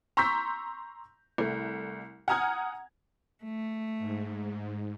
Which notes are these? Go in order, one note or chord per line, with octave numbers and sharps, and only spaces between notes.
A#5 C6 C#6 E6 G6 B6
C2 A3
F#5 G#5 A#5 D#6 F6 G#6
A3
G#2